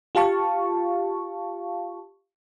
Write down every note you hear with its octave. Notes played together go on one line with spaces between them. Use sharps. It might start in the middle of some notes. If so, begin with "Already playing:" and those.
F4 G4 F5 A5 C#6